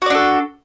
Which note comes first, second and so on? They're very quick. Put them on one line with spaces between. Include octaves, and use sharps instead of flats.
F#4 D5 D4 A4